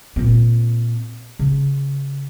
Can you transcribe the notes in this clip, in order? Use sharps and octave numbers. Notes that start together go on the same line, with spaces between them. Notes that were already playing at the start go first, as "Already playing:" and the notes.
A#2 C4
C#3